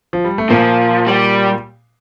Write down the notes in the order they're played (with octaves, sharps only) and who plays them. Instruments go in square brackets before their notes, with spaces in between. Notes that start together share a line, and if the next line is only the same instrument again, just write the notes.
[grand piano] F3
G3
A3
[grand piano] A#2 A#3 [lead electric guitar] F3
[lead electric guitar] G3